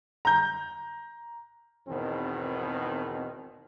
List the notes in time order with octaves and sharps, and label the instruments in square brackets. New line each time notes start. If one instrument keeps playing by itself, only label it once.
[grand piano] A#5 G6
[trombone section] G#1 E2 B2 D#3 C4